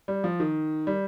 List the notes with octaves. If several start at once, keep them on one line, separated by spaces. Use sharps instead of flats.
G3
F3
D#3
G3